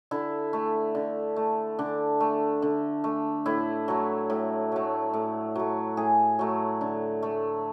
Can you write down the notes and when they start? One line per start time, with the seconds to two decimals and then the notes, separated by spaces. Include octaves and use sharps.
0.11 D3 E4
0.53 A3
0.95 D3
1.36 A3
1.79 D3 D4
2.21 A3
2.62 D3
3.04 A3
3.46 A2 E4
3.88 F#3 A3
4.30 A2
4.72 F#3 A3
5.14 A2
5.55 F#3 A3
5.97 A2 G#4
6.39 F#3 A3
6.81 D3
7.22 A3